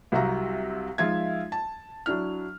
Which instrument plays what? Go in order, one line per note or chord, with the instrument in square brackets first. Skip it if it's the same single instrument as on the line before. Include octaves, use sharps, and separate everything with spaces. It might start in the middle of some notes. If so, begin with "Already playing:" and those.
[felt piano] C2 C3 F#3 F5 A#5
F3 G#3 D#4 F4 E5 G#6
A5
F#3 D4 E4 F6